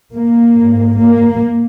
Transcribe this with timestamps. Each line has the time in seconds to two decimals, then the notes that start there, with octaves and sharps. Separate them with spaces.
0.14 A#3
0.56 G#2
0.98 A#3